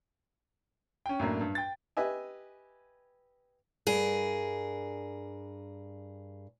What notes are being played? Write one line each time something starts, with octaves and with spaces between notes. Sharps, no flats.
C#4 G5
F#2 A2 A#3 D4
G2
G5 A6
G4 B4 D#5 E5 G#5
G2 G#4 A#4